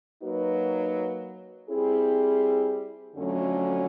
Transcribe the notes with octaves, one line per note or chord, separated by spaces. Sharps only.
F#3 A#3 D#4 F#4 B4
G3 C4 E4 G#4
F2 D3 F#3 A3 C#4